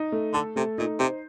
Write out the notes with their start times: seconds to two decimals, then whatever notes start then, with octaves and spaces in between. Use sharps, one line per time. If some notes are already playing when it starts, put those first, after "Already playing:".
Already playing: D#4
0.12 A3
0.33 D3 A4
0.56 C3 A3
0.78 A#2 D#4
0.99 C3 C5